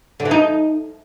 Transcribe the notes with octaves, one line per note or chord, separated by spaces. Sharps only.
D3
E3
D#4